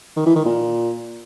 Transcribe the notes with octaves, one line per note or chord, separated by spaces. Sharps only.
D#3
E3
D#3
A#2